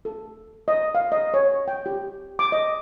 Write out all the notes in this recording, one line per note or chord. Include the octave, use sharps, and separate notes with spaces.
A4
D#5
F5
D#5
C#5
G5
G4
D6
D#5